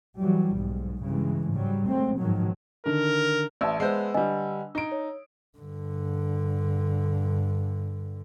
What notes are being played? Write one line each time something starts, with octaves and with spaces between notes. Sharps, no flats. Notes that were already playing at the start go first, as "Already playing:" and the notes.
E3 F#3 G3
B1 G#2
G2 C#3 E3 G#3
G#2 F#3 G3
F#3 G#3 A3 C4
G#2 B2 D#3 F3 F#3
D3 D#3 A#4
A1 D5 E5 A5 E6
G#3 B3 C5
D3 G3 B4 D#5 G#5
D#4 D7
C#5
G2 D3